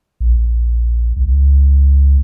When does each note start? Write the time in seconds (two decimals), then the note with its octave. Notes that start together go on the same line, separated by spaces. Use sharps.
0.20 A#1
1.17 C#2